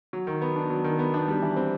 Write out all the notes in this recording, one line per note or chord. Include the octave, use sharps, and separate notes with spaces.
F#3
D#3
B3
D4
F#3
D#3
B3
D4
G3
E3
C4